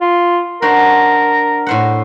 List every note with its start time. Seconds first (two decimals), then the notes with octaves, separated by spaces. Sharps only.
0.01 F4
0.62 D4 F#4 A#4 C5
1.66 A2 C5 F#5